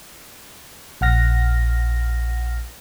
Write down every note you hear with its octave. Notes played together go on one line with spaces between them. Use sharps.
A#1 F#5 F6 A#6